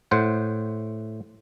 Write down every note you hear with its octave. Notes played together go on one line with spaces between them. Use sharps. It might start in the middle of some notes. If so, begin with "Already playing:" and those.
A2 C5 F#5